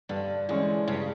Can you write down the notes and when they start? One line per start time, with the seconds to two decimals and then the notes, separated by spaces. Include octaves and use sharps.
0.09 G2 D3
0.49 D3 E3 G#3 C#4
0.88 G2 C#3